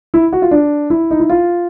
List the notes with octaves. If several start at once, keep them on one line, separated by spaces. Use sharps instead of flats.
E4
F#4
F4
D4
E4
D#4
E4
F4